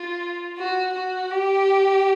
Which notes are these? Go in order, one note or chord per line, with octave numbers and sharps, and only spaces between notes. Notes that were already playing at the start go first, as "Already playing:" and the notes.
Already playing: F4
F#4
F#4
G4